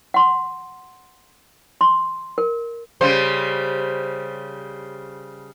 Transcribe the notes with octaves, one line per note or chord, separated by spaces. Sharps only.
F#5 C6
C6
A#4
C#3 G3 C5